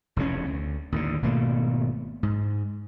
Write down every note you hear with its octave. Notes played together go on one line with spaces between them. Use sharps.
F1 E2 C#3 C#4
D2
D#2 A2 D3
G#1 B2 A3 A#3
G#2